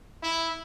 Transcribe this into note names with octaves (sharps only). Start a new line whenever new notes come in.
E4